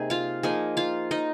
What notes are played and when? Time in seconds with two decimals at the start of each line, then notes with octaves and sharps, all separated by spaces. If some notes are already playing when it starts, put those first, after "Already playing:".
Already playing: C3 A#3 D#4 G#4
0.10 F4 F5
0.43 F3 A#3 D#4 G#4 G#5
0.77 F4 F5
1.11 D#4 D#5